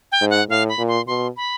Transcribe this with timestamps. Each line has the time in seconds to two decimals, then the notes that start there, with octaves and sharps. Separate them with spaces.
0.12 G5
0.22 G#2
0.30 F#5
0.49 A2 F5
0.69 B5
0.79 A#2
0.88 C6
1.07 B2 C6
1.36 B5